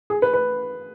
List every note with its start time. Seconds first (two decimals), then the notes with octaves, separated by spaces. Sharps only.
0.10 G#4
0.22 B4
0.34 B4